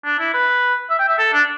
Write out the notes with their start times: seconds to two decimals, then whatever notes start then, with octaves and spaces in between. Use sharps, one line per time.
0.05 D4
0.20 E4
0.34 B4
0.90 E5
0.99 G5
1.09 E5
1.19 A4
1.33 D4